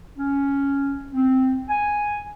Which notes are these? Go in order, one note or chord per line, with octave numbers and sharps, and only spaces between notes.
C#4
C4
G#5